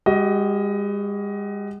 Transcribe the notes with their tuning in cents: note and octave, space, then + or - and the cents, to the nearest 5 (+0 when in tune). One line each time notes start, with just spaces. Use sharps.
G#3 -45 F#4 +35 D#5 +15